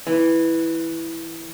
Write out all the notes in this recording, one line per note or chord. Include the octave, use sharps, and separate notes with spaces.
E3